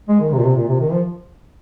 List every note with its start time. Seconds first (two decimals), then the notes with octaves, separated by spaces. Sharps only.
0.09 G#3
0.21 D#3
0.32 C3
0.39 A#2
0.45 C3
0.57 A#2
0.68 C3
0.80 D#3
0.92 F3